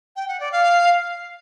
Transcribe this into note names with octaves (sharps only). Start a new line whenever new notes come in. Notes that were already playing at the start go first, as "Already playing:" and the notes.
G5
F#5
D5
F5